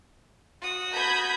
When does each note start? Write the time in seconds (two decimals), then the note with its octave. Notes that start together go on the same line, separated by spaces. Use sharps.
0.62 F#4 D#6
0.94 B5 G6 G#6